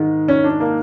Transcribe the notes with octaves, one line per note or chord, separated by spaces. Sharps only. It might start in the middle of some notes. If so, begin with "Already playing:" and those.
Already playing: G#2 D#3 G#3
C#4
D4
A#3